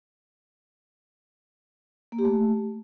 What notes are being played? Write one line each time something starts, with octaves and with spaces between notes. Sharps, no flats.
A#3
G4
A3